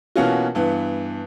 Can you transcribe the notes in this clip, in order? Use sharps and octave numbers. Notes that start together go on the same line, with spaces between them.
B2 E3 A#3 C#4 F4 F#4
G2 E3 B3